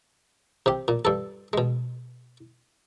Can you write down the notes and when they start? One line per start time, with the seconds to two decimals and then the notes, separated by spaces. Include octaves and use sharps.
0.66 C3 G4
0.88 A#2
1.05 G2 A4
1.53 B2 G#3